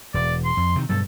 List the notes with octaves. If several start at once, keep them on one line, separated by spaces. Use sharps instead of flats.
E1 D5
C6
F2
C3 D#3
G2 B2 F#3 A4